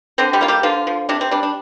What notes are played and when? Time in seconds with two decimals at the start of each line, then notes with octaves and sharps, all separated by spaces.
0.18 D3 C4 C5
0.33 G3 G4
0.41 A#3 F4
0.48 G3 G4
0.63 D3 F3 F4
0.87 F3
1.09 C3 D4
1.21 C4
1.31 G3 D4
1.43 D4